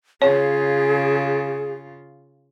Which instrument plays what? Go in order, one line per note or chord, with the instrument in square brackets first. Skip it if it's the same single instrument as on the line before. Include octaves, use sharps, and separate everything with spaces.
[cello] C#3 F4 [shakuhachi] G#4 [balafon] C#5